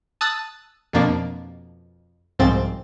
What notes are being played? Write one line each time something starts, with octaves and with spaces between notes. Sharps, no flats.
A5 D#6 E6 F#6 A6
F2 B2 F3 A#3 D4
C2 G#2 F3 C4 A6